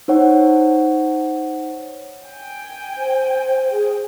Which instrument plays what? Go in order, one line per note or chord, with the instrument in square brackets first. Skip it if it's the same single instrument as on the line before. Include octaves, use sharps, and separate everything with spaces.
[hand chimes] D#4 C5 C#5 F#5
[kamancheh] G5 G#5
[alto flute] C5
[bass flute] G#4